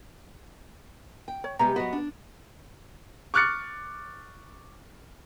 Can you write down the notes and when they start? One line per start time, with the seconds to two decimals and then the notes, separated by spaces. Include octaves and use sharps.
1.28 G5
1.44 C#5
1.59 C3 G3 G#3 B3 A#5
1.76 F#3 B3 F#4 B4 D#5
1.93 D4
3.34 C#6 D6 F6 F#6 A6 C#7